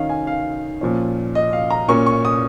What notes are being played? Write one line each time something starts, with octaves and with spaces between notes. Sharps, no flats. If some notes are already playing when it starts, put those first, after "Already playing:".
Already playing: D#3 C#4 D#5 F5
G#5
F5
A#2 F3 C#4
D#5
F5
A#5
A#2 A#3 C#4 C#6
C#6
D#6